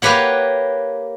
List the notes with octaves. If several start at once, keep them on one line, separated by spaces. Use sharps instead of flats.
A#3 G4 B4 C#5 F#5